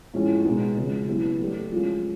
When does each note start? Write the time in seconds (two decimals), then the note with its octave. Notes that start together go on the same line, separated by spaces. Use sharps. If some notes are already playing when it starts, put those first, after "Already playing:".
0.14 A2 F3 G#3 C#4
0.45 B2 G#3 B3 D#4 F#4
0.77 C#3 F3 G#3
1.08 F#3 B3 E4 G4
1.40 F#3 A3 D4 G4
1.71 F3 G#3 C#4 F4